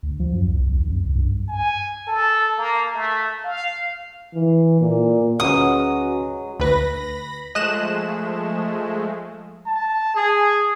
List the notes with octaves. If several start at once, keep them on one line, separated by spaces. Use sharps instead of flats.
D2
F3
F#2
C2
B1
D#2
F#2
C2
G2
G#5
A4
A#3
A3
F5
E3
A#2
D2 F#3 G#3 C#4 F#4 B4 D#6
D2 B4 B5 A#6
F3 G#3 A3 D#5 F#6 E7
A5
G#4